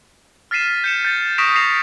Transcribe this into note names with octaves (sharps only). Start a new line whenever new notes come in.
F6 A6 B6 C7 D#7 E7
G6 C#7 E7
G6 A6
C#6 D#6 A#6 B6 D7 E7
D#6 A#6 C7 E7 F7